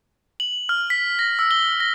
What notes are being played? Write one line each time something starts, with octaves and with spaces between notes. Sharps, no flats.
F#7
F6
B6
A#6
E6
G7
A#6